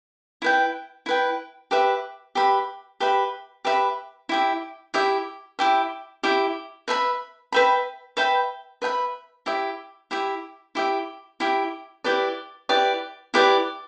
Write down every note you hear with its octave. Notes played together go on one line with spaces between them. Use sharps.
E4 B4 G5
E4 B4 G5
G4 B4 E5 B5
G4 B4 E5 B5
G4 B4 E5 B5
G4 B4 E5 B5
E4 G4 E5
E4 G4 E5
E4 G4 E5
E4 G4 E5
B4 E5 G5 B5
B4 E5 G5 B5
B4 E5 G5 B5
B4 E5 G5 B5
E4 G4 E5
E4 G4 E5
E4 G4 E5
E4 G4 E5
E4 G4 B4 D5
E4 G4 B4 D5
E4 G4 B4 D5